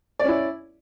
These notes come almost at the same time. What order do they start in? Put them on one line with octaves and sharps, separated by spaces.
D5 C#4 E4